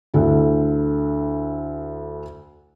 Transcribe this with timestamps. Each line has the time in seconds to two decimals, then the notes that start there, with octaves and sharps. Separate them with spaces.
0.14 D2 D3 E4